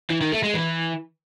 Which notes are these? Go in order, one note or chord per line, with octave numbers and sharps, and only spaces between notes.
E3
D#3
A3
G#3
E3